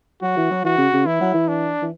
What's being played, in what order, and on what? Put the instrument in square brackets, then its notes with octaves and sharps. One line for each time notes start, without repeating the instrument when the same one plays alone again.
[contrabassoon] F#3 [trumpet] F#4
[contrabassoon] E3
F#3
[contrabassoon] E3 [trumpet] F#4
[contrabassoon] C#3
C#3
[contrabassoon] E3 [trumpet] E4
[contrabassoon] F#3
E3
[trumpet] D4
[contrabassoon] E3